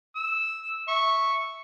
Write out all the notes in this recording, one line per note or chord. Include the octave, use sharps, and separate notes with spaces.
E6
E5 C#6